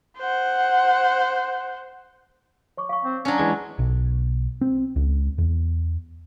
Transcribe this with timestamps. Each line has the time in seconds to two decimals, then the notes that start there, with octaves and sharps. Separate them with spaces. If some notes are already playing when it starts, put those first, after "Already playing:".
0.18 C5 F#5
2.77 C#5 C#6 D6
2.89 F5 C#6
3.03 C4
3.25 F#3 C#4 D4
3.38 E3 G#3 G#6
3.79 B1
4.61 C4
4.96 C#2
5.38 E2